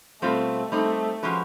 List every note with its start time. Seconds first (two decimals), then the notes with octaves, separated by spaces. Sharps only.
0.22 B2 G3 A3 C4 F4
0.71 G3 A3 C4 D#4
1.23 F3 G#3 C#4 F#4 B4